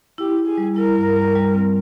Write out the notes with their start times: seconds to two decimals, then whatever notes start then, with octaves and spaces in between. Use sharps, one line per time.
0.18 E4 G4
0.38 E4
0.47 G#4
0.58 G3
0.76 E4 A#4
0.97 G2
1.16 G3
1.35 G3
1.54 C4